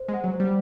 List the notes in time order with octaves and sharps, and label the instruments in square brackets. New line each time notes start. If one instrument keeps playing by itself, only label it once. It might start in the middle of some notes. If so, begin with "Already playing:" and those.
Already playing: [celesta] C5
[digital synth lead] G#3
[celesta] F#5
[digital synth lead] F#3
[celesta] C5
[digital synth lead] G3